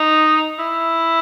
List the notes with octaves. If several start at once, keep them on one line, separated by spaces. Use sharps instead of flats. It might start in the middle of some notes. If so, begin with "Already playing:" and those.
Already playing: D#4
E4